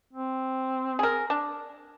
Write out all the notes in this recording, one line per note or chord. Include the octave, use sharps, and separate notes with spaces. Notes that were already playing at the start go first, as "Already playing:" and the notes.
C4
G#4 A#4
D4